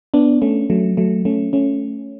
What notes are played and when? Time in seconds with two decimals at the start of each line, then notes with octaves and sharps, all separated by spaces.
0.14 B3 D4
0.42 A3 C#4
0.70 F#3 A3
0.97 F#3 A3
1.25 A3 C#4
1.53 A3 C#4